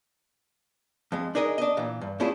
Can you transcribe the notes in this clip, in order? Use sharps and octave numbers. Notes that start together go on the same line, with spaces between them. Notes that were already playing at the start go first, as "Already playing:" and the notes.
F2 G#3
D4 D#4 G#4 A#4 D#5
D4 D#5
A#2 E3
G2
A3 C#4 D4 E4 F4 G#4